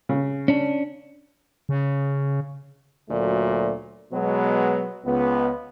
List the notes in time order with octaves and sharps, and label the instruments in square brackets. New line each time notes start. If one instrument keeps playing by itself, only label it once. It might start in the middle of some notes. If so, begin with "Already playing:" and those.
[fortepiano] C#3
[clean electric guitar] C#4 D4
[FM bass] C#3
[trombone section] D2 A#2 F#3 A3
B2 F#3 G#3 B3
C#2 B3